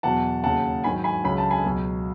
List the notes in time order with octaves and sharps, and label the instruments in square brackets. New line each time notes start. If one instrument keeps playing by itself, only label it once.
[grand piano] E2 B2 F#3 F#5 A5
D#2 C#3 F#3 F#5 A5
G#2 D#3 F#3 G#5 B5
G#5 B5
C#2 C#3 F#3 B5
A5
G#5 B5
C#2 B2 F#3